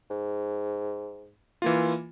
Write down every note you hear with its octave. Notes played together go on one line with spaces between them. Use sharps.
G#2
E3 A#3 F4